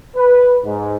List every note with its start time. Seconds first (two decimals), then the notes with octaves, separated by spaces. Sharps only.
0.16 B4
0.64 G#2